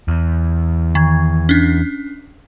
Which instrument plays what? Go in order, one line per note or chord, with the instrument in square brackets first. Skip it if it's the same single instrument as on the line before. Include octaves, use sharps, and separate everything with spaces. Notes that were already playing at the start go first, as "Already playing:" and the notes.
[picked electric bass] E2
[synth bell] D#3 G#6
C#4 D4